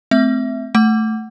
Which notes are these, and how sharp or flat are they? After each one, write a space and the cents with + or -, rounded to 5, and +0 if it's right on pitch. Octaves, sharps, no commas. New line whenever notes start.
A3 -20 C4 -20 E5 +0
A3 +0 F#5 +10